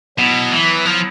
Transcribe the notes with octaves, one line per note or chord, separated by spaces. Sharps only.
B2 F#3 B3 E4
E3
F3